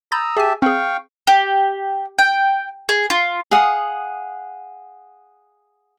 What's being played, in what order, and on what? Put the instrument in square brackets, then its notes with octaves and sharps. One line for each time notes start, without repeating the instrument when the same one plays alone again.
[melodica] A#5 D#6 E6 [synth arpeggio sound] B5 G6 A6
[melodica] G4 E5 A5 [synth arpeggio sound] G#4 G#5
[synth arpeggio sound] C4 G#4 [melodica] F5 G5 C#6
[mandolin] G4
G5
G#4
F4
[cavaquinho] G#4 F5 F#5 D#6